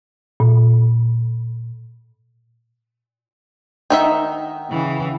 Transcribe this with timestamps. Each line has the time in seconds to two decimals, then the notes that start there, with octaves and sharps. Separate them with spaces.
0.40 A#2
3.90 D#3 D#4 E5 F#5 G5
4.71 C#3 E3